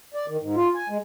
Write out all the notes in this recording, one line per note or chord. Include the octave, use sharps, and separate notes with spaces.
D5
D#3
G#2
F4
G#5
G#3